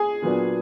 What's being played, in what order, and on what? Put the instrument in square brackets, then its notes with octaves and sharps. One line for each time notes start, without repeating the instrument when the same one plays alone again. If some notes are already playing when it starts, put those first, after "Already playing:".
Already playing: [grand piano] G#4 G#5
A#2 F#3 B3 D4